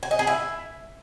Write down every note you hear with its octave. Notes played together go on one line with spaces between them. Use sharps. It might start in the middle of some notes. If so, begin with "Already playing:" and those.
G#5
D#5
G#4
E4